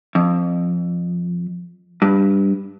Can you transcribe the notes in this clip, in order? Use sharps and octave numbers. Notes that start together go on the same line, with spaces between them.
F2
G2